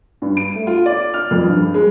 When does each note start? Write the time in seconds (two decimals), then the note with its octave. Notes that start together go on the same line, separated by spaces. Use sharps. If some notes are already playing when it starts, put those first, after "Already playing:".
0.22 G2
0.37 D7
0.55 A3
0.67 F4
0.86 D5
1.14 F6
1.31 F2
1.48 G2
1.74 G#3